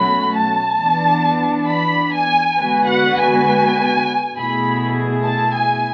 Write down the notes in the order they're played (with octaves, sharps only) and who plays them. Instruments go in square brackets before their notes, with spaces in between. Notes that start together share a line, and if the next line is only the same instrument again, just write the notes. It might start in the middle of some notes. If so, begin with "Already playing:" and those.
Already playing: [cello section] B2 F#3 A3 C#4 F#4 [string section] B5
[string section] A5
[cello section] E3 B3 D4
[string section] B5
G#5
[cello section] D3 G#3 B3 F#4 B4 [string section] G#5
[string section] F#5
G#5
[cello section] B2 A3 E4 G#4 [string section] B5
[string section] A5
G#5